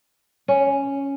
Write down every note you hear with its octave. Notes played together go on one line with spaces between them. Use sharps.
C#4